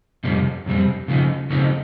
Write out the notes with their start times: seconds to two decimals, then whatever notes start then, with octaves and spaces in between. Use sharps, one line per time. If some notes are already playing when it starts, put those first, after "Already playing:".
0.24 F2 C3 D#3 G3 C4
0.66 F2 C3 G3 C4
1.08 C#3 F3 A3 C4 D#4
1.50 C#3 F3 A3 C4 D#4